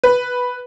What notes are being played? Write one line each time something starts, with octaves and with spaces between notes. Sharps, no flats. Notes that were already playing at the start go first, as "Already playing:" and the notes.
B4